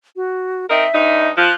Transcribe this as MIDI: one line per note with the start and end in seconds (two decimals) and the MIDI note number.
0.16 0.66 66
0.70 0.85 60
0.70 0.85 63
0.70 0.85 70
0.70 1.27 76
0.94 1.29 43
0.94 1.29 63
1.37 1.52 53
1.37 1.53 90